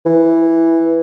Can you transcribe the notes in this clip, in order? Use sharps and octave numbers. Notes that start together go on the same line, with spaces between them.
E3